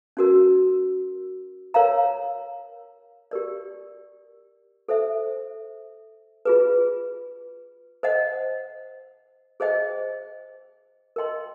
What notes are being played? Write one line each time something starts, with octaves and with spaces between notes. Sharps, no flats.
C#4 F#4 A#4
A#4 C#5 F5 A#5
G4 A#4 D5
A4 C5 E5
F4 G#4 B4
C5 D#5 F#5
G#4 C5 D#5 G5
A#4 D#5 G5 C6